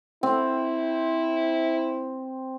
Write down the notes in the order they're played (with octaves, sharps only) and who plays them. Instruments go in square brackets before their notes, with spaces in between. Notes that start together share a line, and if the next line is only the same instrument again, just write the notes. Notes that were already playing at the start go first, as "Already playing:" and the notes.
[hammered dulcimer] C4 [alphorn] E4